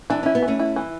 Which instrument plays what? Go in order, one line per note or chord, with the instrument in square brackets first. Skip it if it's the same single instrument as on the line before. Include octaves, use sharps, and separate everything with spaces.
[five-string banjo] E3 [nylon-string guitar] D4
[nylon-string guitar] C#4 [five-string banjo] E4
[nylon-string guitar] B3
[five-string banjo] E3
[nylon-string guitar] A3 C#4
[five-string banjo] E4
E3